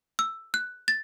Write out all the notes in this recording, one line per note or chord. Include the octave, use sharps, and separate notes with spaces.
E6
F#6
A6